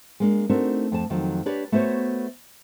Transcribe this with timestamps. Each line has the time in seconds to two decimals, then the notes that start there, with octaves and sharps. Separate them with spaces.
0.20 G#3 A#3 D4
0.49 A3 C4 D4 D#4 F#4 A#4
0.92 F2 A5
1.10 F2 D#3 F#3
1.46 D4 G4 B4 C#5 D5
1.72 A3 B3 F#4 C5 C#5